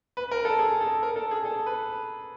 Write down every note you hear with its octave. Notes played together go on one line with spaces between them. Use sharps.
B4
A#4
A4
G#4
A4
A#4
A4
G#4
A4
B4